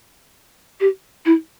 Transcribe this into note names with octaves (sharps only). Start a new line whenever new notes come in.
G4
E4